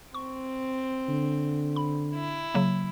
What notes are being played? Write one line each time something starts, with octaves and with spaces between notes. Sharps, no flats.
C4 C#6
D3
B5
E4
C#3 F#3 A#3